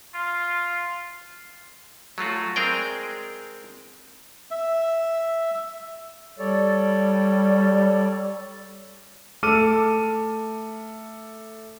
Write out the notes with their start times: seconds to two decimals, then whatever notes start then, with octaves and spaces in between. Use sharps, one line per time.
0.15 F4
2.18 F#3 A3 F4 F#4
2.56 G#3 C4 G#4 A#4 D5 G5
4.51 E5
6.39 G3 A4 C#5 D5
9.43 A3 A4 D6 F6 D#7